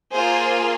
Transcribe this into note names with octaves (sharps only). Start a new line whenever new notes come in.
A#3 F4 G#4 C5